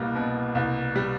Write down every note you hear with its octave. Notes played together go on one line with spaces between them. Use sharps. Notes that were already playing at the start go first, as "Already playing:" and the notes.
Already playing: C2 B2 G3 A#3
B2
C2
G3